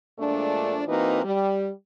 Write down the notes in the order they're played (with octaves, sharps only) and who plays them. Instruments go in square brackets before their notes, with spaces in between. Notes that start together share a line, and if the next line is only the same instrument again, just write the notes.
[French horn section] A#2 F3 G#3 A3 D4
E3 A#3 C4 D#4 F#4 B4
G3